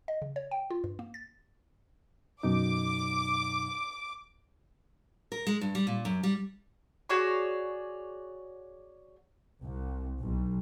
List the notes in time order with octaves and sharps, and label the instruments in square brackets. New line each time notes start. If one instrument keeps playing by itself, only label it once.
[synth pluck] D#5
C#3
C#5
G5
F4
G2
A#3
A6
[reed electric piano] F#2 B2 D#4 [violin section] D6
[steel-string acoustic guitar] A#4
G#3
G2
G3
A#2
F#2
G3
[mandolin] F#4 G#4 C#5 D5
[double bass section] C2
B1